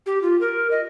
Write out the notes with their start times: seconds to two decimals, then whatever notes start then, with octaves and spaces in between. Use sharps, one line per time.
0.06 G4
0.22 F4
0.41 A#4
0.71 D#5